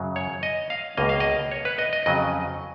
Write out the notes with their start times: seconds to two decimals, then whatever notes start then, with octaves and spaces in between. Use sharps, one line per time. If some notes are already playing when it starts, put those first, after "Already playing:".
Already playing: F#2 C#3 F#3
0.16 C#5
0.43 D#5
0.70 F5
0.97 C#2 B2 A#3 D#5
1.09 F5
1.20 D#5
1.52 C#5
1.65 B4
1.79 D#5
1.93 D#5
2.06 F2 C#3 F#3 D#5